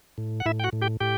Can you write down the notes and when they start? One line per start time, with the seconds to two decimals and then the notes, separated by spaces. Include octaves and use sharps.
0.18 A2
0.40 F#5
0.46 A2 E4 E5
0.60 G5
0.64 F#4 F#5
0.73 A2
0.82 G4 G5
1.00 A2 G4 G5